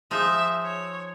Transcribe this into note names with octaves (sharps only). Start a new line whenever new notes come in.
F3 D#4 G#4 E5
C#5